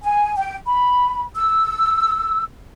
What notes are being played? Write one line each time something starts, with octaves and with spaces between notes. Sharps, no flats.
G#5
G5
B5
E6